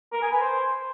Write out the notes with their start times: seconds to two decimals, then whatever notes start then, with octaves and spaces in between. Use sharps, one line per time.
0.13 A#4
0.22 G#5
0.31 B4
0.41 C5